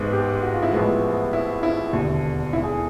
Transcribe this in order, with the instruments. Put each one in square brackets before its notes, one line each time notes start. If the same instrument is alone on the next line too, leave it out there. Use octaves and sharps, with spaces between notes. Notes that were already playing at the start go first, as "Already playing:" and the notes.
Already playing: [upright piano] A1 G#2 G#3 B3
[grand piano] G4
F#4
F4
E4
[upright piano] A1 A2 F3 G#3 B3
[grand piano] E4
E4
[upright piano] E1 D#2 D3
[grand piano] E4
G#4